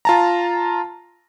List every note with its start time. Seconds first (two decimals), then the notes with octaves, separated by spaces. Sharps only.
0.05 F4 A5 A#5